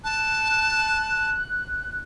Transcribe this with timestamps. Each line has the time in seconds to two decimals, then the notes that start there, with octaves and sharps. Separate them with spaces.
0.04 A5 F#6